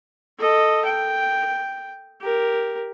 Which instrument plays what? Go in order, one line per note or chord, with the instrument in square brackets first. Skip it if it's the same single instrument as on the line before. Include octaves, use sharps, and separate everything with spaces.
[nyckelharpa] A4 D#5
G5
G4 A#4